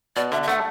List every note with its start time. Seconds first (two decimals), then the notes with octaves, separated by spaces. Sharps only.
0.16 B2 D5
0.32 D3 E5
0.43 E5
0.48 A3 F#5